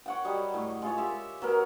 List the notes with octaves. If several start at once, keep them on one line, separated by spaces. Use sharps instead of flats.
C#5 F#5 G5
F#3 G3 D#5
A2
G#3 F4 C#5
G4 E5
F#3 B3 A#4